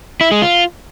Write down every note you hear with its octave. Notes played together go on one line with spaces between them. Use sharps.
E4
G#3
F4